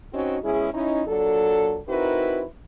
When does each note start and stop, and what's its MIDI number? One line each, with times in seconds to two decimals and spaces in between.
0.13 0.38 60
0.13 0.38 61
0.13 0.38 63
0.13 0.38 66
0.44 0.70 47
0.44 0.70 56
0.44 0.70 61
0.44 0.70 64
0.44 0.70 68
0.73 1.02 61
0.73 1.02 63
0.73 1.02 64
1.07 1.78 46
1.07 1.78 54
1.07 1.78 62
1.07 1.78 69
1.88 2.44 60
1.88 2.44 63
1.88 2.44 64
1.88 2.44 66
1.88 2.44 70
1.88 2.44 71